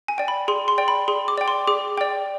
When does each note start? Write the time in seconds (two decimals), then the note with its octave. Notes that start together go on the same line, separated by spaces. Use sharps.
0.08 G#5
0.18 D5 G5
0.28 B5
0.48 G#4 C6
0.68 C6
0.78 D5 G5
0.88 B5
1.08 G#4 C6
1.28 D6
1.38 D5 G5
1.48 C6
1.67 G#4 D6
1.98 D5 G5